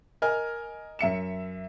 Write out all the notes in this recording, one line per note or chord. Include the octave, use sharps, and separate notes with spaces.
A#4 D#5 G#5 F6
F#2 E5 C#7 E7